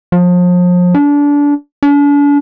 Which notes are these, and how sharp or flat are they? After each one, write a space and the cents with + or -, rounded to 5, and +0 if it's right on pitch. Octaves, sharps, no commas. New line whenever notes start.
F3 +35
D4 -25
D4 -40